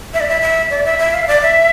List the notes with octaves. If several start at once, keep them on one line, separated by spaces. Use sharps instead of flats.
E5
D5
E5
E5
D5
E5
E5
F5
E5
D5
E5